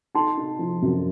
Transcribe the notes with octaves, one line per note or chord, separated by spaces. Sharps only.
D#4 A5 C6
D#4
F3
F#2